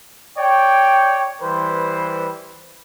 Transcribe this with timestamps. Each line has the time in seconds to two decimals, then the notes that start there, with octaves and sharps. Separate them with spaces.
0.38 C#5 D5 G5
1.42 E3 G3 B4 C5